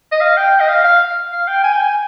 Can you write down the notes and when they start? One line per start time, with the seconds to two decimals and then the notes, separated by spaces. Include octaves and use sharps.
0.12 D#5
0.21 F5
0.37 G5
0.60 D#5
0.68 F5
0.84 F5
1.32 F5
1.48 G5
1.64 G#5
1.72 G5
1.82 G#5